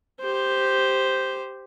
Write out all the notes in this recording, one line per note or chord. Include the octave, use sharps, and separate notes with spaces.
G4 C5